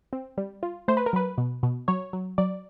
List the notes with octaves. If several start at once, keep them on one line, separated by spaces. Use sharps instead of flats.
C4
G3
F4
A3 C5
B4
A#4
F#3 B4
B2
B2
F#3 C#5
F#3
F#3 D5